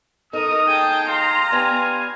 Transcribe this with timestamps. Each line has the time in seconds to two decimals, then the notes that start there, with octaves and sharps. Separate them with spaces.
0.33 D#4 A4 A#4 D#6
0.67 G#4 G5 A5
1.08 F4 A#5 C6
1.52 B3 D4 G4 G#5